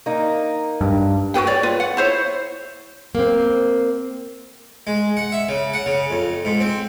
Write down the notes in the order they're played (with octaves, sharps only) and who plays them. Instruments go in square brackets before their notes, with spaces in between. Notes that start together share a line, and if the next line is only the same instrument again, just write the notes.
[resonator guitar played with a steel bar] A#3 D#4
[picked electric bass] G2
[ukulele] F#4 G#4 B4 G5
C#5 D5
F4 B4
F#5
E4 C5 C#5
[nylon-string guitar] A#3 C4
[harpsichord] G#3
F#5
E5
C#3
F#5
C#3
F2
G#2
C4